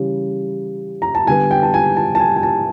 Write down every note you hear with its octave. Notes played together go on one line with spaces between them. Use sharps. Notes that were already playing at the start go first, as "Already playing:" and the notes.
Already playing: C#3 E3 G3
A#5
A5
D3 G3 B3 G#5
G5
A5
G#5
A5
A5
G#5
G#5
A5